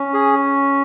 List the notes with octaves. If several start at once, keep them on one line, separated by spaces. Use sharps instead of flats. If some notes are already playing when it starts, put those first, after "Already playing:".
Already playing: C#4
G#4